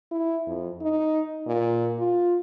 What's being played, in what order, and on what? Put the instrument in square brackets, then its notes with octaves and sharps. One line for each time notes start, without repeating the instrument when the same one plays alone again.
[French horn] E4
F2
D#4
A#2
F4